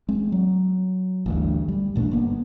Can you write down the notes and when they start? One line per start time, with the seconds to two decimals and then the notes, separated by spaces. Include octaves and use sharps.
0.09 G#3 C4
0.32 F#3
1.26 A1 D2 G2
1.68 G3
1.96 A1 A#2 A3 D4
2.11 G1 A#3 B3